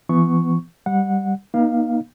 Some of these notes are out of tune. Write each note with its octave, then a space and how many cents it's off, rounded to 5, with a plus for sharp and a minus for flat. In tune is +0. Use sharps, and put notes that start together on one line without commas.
E3 +35 B3 +15 C#6 +0
G3 +0 F#5 -20
A#3 +45 D#4 +0 F5 +0